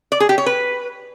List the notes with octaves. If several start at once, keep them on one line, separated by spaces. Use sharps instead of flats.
D5
G#4
G4
C#5
B4